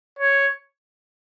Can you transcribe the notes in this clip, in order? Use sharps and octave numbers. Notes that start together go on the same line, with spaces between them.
C#5